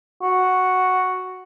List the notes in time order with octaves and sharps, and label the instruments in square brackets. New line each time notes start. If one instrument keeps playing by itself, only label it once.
[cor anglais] F#4